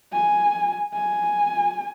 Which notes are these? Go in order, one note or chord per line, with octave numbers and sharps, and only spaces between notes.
G#5
G#5